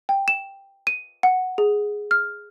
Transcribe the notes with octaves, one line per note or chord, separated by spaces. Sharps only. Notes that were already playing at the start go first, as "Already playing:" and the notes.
G5
E7
D#7
F#5
G#4
F6